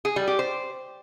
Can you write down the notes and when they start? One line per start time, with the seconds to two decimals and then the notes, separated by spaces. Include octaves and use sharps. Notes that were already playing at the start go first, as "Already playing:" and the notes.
0.05 G#4
0.16 G3
0.28 G4
0.39 C5